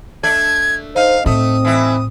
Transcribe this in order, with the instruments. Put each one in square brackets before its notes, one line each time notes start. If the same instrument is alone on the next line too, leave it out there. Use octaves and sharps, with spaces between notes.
[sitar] A3 D4 D5 [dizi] G#6
[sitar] D#4 [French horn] C5 [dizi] F5
[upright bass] A2 [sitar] A3 [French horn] C4 [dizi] D#6
[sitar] E3 E4